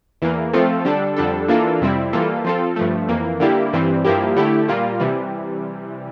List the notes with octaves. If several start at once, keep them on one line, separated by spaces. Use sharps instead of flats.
E2 E3 A#3
F3 A3 C4 F4 A4
D3 G3 D4 A4
F2 D3 G3 D4 A4
E3 A#3 D4 F4 A4
F2 C3 G3 C4 E4
E3 G3 A#3 F4 A4
F3 C4 F4 A4
G2 F3 A3
F2 E3 A#3
D3 G3 A#3 E4 G4
G2 E3 G3 C4
G2 F3 A#3 E4 G4
D3 A3 E4 G4
A#2 G3 A#3 F4
C3 E3 G3